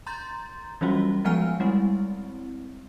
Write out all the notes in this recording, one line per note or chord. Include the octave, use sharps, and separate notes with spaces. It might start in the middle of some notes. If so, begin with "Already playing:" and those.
A#5 C6 G6 A6
E3 F#3 G3 C#4 F4 F#4
F3 G#3 B3 F#5 G#5 F6
G3 G#3 C4 E4